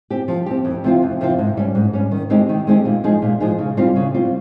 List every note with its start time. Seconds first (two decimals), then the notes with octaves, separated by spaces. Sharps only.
0.10 C4 G4
0.28 F3
0.46 C4 G4
0.65 F2
0.84 C3 F3 C4 F4
1.02 F2
1.21 C3 F3 C4 F4
1.38 G#2
1.57 G3 C#4
1.75 G#2
1.93 G3 C#4
2.11 D#3
2.30 G#3 C4 D#4 G4
2.49 D#3
2.67 G#3 C4 D#4 G4
2.85 A#2
3.04 F3 G#3 D#4 G#4
3.22 A#2
3.40 F3 G#3 D#4 G#4
3.58 C#3
3.77 G3 C4 F4
3.96 C#3
4.14 G3 C4 F4